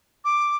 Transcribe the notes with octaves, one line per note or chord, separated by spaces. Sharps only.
D6